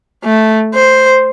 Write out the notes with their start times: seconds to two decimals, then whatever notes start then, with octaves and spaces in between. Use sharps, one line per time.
0.24 A3
0.75 C5